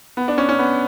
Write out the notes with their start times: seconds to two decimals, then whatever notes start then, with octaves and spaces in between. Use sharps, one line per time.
0.17 B3
0.28 D4
0.38 C#4
0.49 C#4
0.59 B3